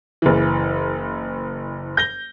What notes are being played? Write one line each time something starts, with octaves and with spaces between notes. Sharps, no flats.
F#1 E3
G6 A#6 G7